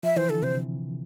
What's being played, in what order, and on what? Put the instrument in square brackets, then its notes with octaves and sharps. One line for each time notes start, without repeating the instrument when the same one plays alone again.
[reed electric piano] F3 [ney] E5
[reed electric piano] E3 [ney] C5
[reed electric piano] D3 [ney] A4
[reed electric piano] C3 [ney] C5